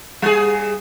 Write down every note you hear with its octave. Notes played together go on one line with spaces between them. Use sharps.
G3 G#4